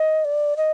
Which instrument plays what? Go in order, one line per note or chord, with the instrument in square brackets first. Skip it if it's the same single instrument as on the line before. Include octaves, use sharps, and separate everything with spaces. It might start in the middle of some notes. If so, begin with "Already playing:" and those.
Already playing: [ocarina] D#5
D5
D#5